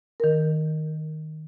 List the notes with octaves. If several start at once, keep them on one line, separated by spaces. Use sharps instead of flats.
D#3 A#4